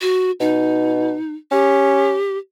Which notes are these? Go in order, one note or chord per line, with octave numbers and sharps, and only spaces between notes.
F#4
B2 D#4
C#4 G4